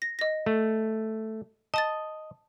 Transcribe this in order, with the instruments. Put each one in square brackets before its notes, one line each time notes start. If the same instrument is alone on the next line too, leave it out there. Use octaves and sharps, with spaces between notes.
[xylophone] A#6
D#5 A#6
[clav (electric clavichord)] A3
[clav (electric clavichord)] D#5 [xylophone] A5 D#6 A6